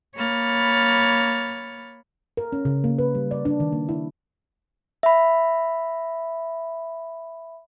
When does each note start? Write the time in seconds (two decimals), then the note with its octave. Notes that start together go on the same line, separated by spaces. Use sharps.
0.16 A#3 C#5 B5 F6 A6
2.37 A#4
2.53 C#4
2.65 C#3
2.84 A#3
2.98 B4
3.15 G3
3.31 D5
3.45 D4
3.60 D#3
3.72 A#3
3.89 E4
5.03 E5 B5